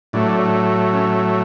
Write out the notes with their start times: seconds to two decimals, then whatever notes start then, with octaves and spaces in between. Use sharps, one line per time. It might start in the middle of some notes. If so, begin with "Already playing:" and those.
0.13 A2 F#3 A3 D4
0.93 C#4